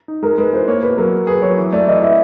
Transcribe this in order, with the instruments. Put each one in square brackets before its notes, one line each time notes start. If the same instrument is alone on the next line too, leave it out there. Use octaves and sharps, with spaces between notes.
[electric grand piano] D#4
[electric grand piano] G#3 [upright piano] A#4
[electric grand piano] G#3 [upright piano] B4
[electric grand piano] E3 [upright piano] C5
[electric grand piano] A#3 [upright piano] C#5
[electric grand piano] B2 [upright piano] B4
[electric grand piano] F#3 [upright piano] A#4
[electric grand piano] F#3
[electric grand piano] G#4 [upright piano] B4
[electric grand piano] F#3 [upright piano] C#5
[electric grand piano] E3
[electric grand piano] A3 [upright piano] D5
[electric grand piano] E3 [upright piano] D#5
[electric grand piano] E3 [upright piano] E5